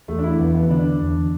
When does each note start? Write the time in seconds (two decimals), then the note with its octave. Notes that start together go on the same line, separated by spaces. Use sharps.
0.08 E2 A3
0.19 D4
0.24 E4
0.39 E2 B3
0.55 B3
0.70 D3 D4
1.01 E2